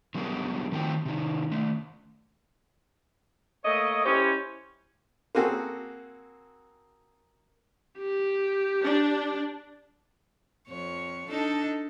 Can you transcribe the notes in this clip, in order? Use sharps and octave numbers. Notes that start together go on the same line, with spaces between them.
D3 F#3 G3 B3 G#4 A#4
D#3 F3 A3 C4 F#4 G5
C3 D#3
D#3 A3
A3 A#3 C#5 D#5
C#4 E4 G4 C5 C#5
A#3 C4 F#4 G#4 A4
G4
D4
F2 C#5
D4 D#4 A4